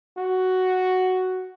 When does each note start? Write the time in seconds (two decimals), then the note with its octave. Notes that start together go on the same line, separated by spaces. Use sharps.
0.17 F#4